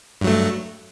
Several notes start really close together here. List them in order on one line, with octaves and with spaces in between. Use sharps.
G2 F#3 A3